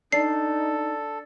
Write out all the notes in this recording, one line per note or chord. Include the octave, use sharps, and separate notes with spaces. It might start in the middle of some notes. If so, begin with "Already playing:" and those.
D4 D#4 A4 C7